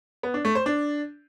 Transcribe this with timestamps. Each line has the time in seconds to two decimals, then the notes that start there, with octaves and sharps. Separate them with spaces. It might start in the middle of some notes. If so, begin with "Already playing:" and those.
0.23 B3
0.34 D4
0.45 A3
0.55 C5
0.66 D4